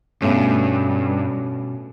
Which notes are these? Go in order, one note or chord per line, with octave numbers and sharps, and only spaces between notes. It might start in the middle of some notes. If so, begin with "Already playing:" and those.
G2 B2 A3 C#4